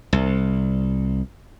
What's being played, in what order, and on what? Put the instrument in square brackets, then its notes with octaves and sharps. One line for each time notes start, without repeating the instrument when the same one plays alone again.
[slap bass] C2